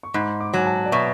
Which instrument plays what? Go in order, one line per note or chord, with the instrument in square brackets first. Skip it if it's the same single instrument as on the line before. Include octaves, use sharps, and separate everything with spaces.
[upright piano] C#6
[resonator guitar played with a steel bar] G#2 [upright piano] B5
[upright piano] D6
[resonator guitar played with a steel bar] F#3 [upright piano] G#5
[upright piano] A5
D5
[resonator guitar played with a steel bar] B2 [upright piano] E5